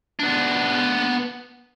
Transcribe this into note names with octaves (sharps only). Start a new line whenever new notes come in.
B3 D4